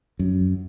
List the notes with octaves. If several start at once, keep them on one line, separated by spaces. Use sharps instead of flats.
F#2